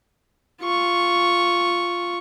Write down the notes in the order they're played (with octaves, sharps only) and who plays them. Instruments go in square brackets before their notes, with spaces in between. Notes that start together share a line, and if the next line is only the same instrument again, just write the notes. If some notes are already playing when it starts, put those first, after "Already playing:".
[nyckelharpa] F4 C#6